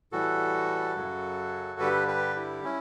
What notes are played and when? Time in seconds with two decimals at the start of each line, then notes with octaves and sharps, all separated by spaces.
0.12 A2 E3 G3 F#4 A4
0.96 F#2 C#3 F#3
1.80 G2 D3 G3 G4 B4
2.08 G4 B4
2.36 E4 G4
2.65 C#4 E4